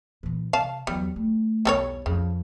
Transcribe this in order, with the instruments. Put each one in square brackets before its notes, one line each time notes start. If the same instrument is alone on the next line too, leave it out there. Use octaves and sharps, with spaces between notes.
[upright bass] A#2 E3
[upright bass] C3 [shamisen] F5 A5
[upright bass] E2 F#3 [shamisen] G3
[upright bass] A3
[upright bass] B1 E2 [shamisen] G3 A4 C#5
[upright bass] F2 [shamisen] C#3